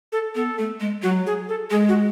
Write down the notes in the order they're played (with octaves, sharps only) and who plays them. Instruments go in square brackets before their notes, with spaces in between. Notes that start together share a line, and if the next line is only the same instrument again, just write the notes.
[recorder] A4
[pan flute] B3 [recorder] A4
[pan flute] A3
G#3
[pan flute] F#3 [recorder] F#4
[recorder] G#4
A4
[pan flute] G#3 [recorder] G#4
[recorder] F#4